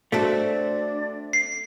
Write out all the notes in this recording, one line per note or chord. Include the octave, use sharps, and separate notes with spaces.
A3 C4 D4 F#4 A4
C7